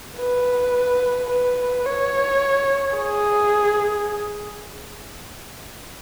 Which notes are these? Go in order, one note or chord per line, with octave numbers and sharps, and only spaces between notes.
B4
B4
C#5
G#4